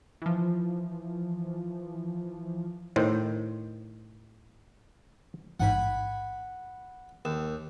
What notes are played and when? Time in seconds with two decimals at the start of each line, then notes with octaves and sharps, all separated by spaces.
0.22 E3 F3
2.96 A2 D#3 C5
5.60 A1 G#2 F#5 G#5 B5
7.25 D#2 E7